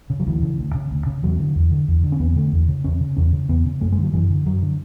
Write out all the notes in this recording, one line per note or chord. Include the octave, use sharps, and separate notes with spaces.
C#3
F#3
D2 E3
C#3
D2
C#3
D2
C#3
E2 F#3
D3
E2
D3
E2
D3
C#4
E2 B3
D3 A3
E2
C#3
E2 C#4
C#3
E2 C#4
C#3
E2 B3
C#3
F#2 A3
G#3
D3 F#3
F#2 E3
D3
F#2 F#3
D3